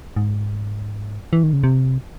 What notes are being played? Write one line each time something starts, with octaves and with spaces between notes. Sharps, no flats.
G#2
E3
D#3
C#3
C3